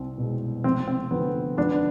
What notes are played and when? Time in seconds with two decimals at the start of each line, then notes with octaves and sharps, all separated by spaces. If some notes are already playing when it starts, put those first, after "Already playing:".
Already playing: C2 C4
0.18 B2 G#3
0.64 F1 C4
0.88 C4
1.11 F2 D3 B3
1.57 F2 B3 D4